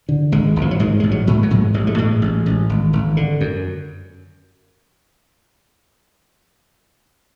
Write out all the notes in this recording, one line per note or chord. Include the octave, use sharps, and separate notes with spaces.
D3
G#1 G#3
G#1
F3
F#3
G#2 G#3
A1 G#3
F#3
G#2
F#3
G#2
A1 G#3
A3
A2 G#3
A1
A1
G#1
G#1
D3
F#2